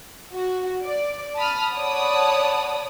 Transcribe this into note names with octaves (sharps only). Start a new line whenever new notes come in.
F#4
D5
A5 B5 D#6 F6
C#5 D5 F#5 A5 B5 D#6